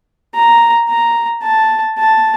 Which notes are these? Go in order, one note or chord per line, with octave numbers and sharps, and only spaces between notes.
A#5
A#5
A5
A5